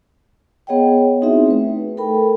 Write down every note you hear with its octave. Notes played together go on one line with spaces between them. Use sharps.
B3 G#4 C#5 D#5 F#5 G5
C4 D#4 E4 F#4 G#4 E5
A3 B4
A4 A#4 G5 B5